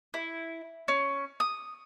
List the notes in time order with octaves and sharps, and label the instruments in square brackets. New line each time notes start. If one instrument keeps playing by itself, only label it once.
[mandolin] E4
C#4
D#6